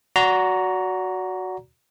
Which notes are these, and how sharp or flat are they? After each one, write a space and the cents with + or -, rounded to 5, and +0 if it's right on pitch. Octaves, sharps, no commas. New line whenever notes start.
F#4 +0 D5 -35 A#5 +0